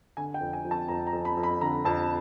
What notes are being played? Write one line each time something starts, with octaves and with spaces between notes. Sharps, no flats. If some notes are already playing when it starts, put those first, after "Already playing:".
D3 G#5
G5
F2
G#5
F3
A5
F2 A#5
A#5
F2
B5
F2
B5
D3 A#5
F2 A5